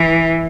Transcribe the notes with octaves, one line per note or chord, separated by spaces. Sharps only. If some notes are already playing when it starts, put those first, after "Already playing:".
Already playing: E3